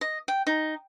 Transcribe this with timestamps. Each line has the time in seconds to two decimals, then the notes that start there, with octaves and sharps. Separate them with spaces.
0.01 D#5
0.28 G5
0.47 D#4